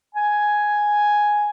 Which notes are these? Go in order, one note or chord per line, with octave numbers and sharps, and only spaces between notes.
G#5